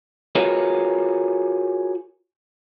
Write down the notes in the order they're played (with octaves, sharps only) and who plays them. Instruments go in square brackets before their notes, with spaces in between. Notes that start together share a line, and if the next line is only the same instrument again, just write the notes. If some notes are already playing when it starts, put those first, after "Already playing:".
[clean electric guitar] F4 F#4 G#4 A#4 B4 C#5